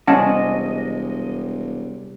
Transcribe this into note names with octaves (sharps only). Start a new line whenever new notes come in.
E1 C3 G3 C#4 D#5 F#5 A5